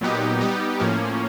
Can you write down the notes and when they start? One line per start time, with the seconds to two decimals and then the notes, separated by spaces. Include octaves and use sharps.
0.01 A#2 F#3 B3 D#4 G4
0.41 G3 B3 D#4 G4
0.80 A2 F3 A#3 C#4